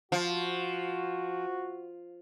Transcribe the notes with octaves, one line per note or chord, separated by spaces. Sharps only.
F3 F#4